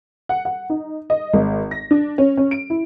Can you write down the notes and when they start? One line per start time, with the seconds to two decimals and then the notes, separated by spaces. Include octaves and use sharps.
0.29 F#5
0.45 F#5
0.70 D#4
1.10 D#5
1.34 G#1
1.71 A#6
1.91 D4
2.18 C#4
2.37 C#4
2.51 D7
2.70 E4